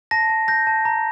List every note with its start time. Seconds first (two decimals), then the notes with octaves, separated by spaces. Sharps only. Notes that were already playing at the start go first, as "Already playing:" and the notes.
0.11 A5 A#6
0.30 A5
0.48 G6 A#6
0.67 A5
0.85 A#5